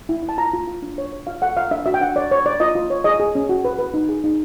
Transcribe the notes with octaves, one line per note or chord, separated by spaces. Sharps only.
E4
E4
A5
F4 A#5
F4
F4
D4
C#5
C#5
F4 F5
A4 F#5
F4 F5
D4 E5
F#4 E5
G5
D4 F#5
C#5 D5
C#5
C#5 D5
F4 D#5
F4
C#5
G#4 D#5
G#4
C#4
F#4
B4
B4
D#4
G#4
D#4